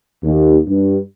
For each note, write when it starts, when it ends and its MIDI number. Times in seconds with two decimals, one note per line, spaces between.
0.23 0.58 39
0.68 0.97 43